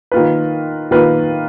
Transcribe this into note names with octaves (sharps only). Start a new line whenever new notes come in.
D#3 A#3 F4 B4
D#3 A#3 F4 B4